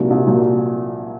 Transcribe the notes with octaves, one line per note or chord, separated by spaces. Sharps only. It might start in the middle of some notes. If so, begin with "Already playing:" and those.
Already playing: C2 A#2 F#3
C2
A#2 F#3